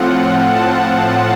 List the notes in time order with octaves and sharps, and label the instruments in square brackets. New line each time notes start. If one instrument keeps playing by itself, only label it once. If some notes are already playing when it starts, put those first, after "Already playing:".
Already playing: [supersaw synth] A2 F3 C4 F4 F#5
A5